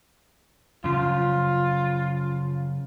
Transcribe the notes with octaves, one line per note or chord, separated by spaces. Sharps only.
F#2 C#3 F3 F4